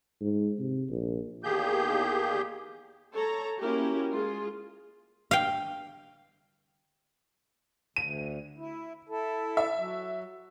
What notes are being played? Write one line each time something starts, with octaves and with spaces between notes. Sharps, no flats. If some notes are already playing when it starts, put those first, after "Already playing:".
G#2
C3
A#1
E2 D#3 A#3 G4 G#4 G6
A4 C#5 A5 A#5
A#3 C#4 E4 F#4 G4 A#4
G#3 F4 G#4
F5 G5
D2 D#7
E4
E4 A4
E5
F#3